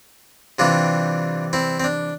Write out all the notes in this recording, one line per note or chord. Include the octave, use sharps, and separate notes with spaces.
C3 E3 G3 D4 F4
C4 E4
C4
D4